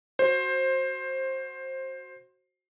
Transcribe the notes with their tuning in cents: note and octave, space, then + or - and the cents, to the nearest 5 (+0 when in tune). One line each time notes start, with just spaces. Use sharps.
F#4 +0 C5 +15